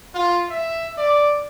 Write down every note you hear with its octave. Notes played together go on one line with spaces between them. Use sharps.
F4
E5
D5